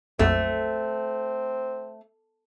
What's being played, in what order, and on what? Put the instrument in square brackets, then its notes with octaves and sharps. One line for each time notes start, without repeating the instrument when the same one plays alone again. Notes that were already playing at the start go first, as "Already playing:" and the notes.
[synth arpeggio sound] A#1 F2 F#3 [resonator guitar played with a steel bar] A3 [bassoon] C4